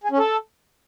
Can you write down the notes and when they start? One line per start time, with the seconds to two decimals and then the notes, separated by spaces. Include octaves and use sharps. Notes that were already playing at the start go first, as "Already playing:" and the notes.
0.04 G#4
0.11 C#4
0.19 A4